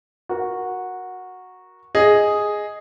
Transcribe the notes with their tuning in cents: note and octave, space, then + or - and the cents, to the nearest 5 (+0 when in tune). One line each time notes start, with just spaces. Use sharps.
F#4 -10 A#4 +10
G#4 +0 D#5 +0